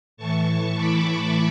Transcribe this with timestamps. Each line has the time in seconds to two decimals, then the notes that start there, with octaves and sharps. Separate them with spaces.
0.17 A2 E3 A5 C#6
0.46 A5 C#6
0.76 B5 D6